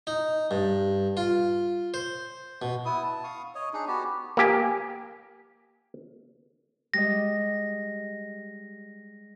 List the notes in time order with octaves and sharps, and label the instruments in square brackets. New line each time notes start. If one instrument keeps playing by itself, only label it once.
[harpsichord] D#4
G2
F4
C5
B2
[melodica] B3 E4 D#6
A5
F5 C#6 D#6
C#5 D#5
D4 D#4 G#4
B3 F#4 G4
[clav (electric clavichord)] A#3 G4 G#5
[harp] G3 G#3 D#5 [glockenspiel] A#6